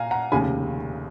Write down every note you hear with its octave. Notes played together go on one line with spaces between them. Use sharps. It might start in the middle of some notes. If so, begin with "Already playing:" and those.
Already playing: A#2 F5 G#5 A#5
F#5 A#5
F1 D#2 C#3 G#5 B5